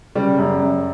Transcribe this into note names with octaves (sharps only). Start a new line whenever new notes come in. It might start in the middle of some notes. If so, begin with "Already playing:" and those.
C#3 G3
F#2
F#2